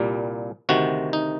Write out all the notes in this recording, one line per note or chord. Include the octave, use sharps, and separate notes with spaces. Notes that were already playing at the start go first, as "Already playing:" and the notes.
Already playing: C2 A#2 G3 A#3
D2 C3 D#3 F#4
D#4